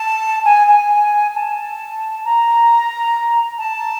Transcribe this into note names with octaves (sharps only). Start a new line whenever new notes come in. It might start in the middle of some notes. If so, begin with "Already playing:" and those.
Already playing: A5
G#5
G#5
A5
A#5
A5